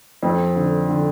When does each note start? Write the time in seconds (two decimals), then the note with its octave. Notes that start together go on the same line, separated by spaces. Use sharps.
0.23 F2
0.56 D3
0.89 D3